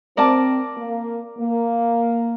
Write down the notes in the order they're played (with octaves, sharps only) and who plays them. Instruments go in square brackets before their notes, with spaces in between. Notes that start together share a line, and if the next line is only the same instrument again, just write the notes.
[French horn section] C4 [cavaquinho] A#4 D5 A5 D6
[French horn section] A#3
A#3